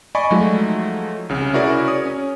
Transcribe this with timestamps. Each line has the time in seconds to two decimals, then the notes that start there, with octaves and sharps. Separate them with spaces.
0.15 D5 D#5 G#5 B5 C#6
0.31 F3 F#3 G#3 A3 D#4
1.29 C2 C#3
1.53 C#4 E4 F#4 G#4 A#4 D5
1.87 C#5 D#6
2.05 C#4